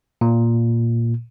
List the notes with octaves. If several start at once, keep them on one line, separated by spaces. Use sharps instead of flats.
A#2